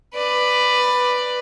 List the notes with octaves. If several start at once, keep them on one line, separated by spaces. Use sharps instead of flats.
B4 D5